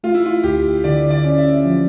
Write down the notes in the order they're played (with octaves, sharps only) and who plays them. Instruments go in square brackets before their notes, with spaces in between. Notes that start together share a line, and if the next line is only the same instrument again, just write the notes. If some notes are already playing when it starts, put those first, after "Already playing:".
[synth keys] A3 [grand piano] F4
[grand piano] E4
F4
[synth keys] D2 [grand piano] G4
[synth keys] D3 [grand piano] D5
[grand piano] D5
[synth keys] C#4
[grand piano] E5
[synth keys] F3